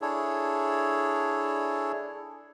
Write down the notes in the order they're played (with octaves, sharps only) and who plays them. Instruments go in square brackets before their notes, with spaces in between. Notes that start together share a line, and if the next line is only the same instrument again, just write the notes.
[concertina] D4 E4 G#4 A4 C#5